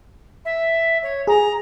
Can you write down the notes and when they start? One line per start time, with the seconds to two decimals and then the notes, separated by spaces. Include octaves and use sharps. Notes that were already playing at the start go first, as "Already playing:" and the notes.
0.45 E5
1.02 C#5
1.27 G#4 A#5